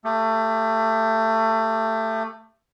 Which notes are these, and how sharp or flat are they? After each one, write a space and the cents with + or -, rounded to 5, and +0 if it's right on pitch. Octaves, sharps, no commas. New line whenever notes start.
A3 +25 G4 +35